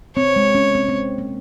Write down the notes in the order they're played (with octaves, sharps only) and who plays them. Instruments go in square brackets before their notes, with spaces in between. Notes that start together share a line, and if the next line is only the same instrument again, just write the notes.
[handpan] C4 [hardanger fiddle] C#5
[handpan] G#3
C#4
C4
C4
A#3